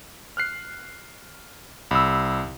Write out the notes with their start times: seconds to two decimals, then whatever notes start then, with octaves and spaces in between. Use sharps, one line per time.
0.37 F6 F#6 C7
1.91 C2 B5 E6